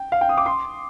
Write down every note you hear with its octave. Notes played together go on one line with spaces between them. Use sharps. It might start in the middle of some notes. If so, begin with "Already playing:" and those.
Already playing: G5
F5
G5
D#6
D6
C6